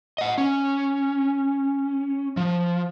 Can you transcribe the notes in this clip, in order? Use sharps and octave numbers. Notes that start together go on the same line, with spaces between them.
D#5 F#5
C#4
F3